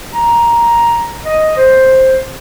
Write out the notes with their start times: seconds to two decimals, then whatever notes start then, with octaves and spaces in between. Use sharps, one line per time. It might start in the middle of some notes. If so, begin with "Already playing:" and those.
0.14 A#5
1.24 D#5
1.57 C5